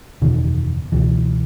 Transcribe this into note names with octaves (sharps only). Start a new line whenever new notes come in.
F#1 E2 B2 D#3
C#2 B2 E3